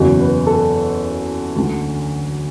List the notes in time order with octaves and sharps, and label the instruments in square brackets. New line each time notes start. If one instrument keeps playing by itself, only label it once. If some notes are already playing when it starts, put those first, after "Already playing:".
Already playing: [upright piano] F#1 E2 B2
B4
A4
D2 D3